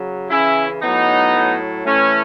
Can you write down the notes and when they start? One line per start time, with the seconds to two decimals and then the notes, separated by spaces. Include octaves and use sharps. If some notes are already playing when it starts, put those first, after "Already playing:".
Already playing: C#3 F#3
0.30 C#3 E3 C#4 E4
0.82 A2 F#3 B3 D#4
1.34 A2 F#3
1.85 A2 E3 A3 C#4